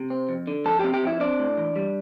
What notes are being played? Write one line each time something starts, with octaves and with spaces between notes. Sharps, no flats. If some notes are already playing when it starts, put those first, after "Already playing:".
Already playing: C3
C4
F2
D3
F3 A4 A5
C4 G4 G5
G4 G5
F2 E4 E5
C4 D4 D5
A2
E3
G3